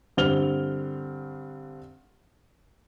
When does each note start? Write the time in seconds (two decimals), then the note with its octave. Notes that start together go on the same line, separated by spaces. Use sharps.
0.17 G2 D3 C4 F6 F7 G7